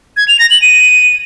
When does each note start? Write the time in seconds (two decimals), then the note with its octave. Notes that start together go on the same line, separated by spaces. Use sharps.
0.17 G#6
0.28 F7
0.39 A#6
0.51 F#7
0.62 D#7